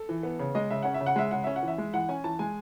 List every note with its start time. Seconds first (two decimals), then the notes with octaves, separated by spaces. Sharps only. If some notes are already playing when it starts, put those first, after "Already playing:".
Already playing: A4
0.09 E3
0.23 B3
0.39 C#3
0.55 G#3 D#5
0.70 C#3 E5
0.83 C#4 F#5
0.94 E5
1.00 C#3
1.06 F#5
1.16 G#3 E5
1.31 C#3 F#5
1.44 C#4 E5
1.56 F#5
1.63 E3
1.68 E5
1.78 G#3
1.93 E3 F#5
2.09 C#4 G#5
2.24 E3 A5
2.39 G#3 G#5